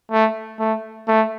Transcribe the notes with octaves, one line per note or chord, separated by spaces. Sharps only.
A3
A3
A3